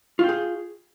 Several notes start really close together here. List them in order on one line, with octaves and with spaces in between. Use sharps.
F4 G5 G#4